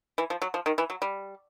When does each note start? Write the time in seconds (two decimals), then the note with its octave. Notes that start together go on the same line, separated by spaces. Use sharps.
0.18 E3
0.30 F3
0.42 F#3
0.54 F3
0.66 D#3
0.78 E3
0.90 F#3
1.02 G3